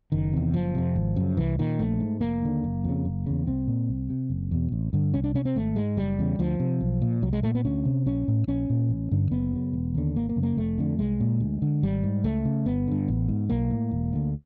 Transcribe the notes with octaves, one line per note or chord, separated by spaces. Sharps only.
F#1 D#3
E2 C3
F#1 F3
F2 C3
G#1
F#2 C#3
C2 E3
A#2 D#3
A#1 A3
G#2
F1 A#3
D#2 D3
F#1
F2 C#3
F#1
E2 C#3
C2 C4
A#2
C2
C3
F#1
E2 B2
A1
G2 D3
C2 C#4
D4
C3 C#4
C4
G#1 A3
G#2 G#3
F#1 G3
E2 C#3
D2 F3
C3
B1
A#2
C2 F#3
G#3
A#2 A3
B3
D2 C#4
C3
A#1 C#4
A2
A#1 C#4
A#2
A1
G2 D3
F#1 B3
F#2 C#3
E1
D#2 D3
G#1 A#3
A#3
F#2 C#3
A#3
F1 A3
F2 D3
C2 G#3
A#2
D2
D3
G#1 G3
G#2
C#2 A3
C#3
G1 B3
G2 D3
A1
G#2
B1 A#3
A2
E1
D2 D3